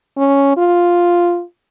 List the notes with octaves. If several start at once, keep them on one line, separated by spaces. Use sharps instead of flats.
C#4
F4